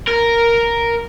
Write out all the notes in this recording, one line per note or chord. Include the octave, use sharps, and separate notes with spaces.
A#4